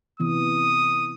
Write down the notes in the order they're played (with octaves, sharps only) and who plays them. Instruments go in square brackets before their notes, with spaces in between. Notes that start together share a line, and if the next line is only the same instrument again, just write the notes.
[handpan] C3 E3 B3 [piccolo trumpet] D#6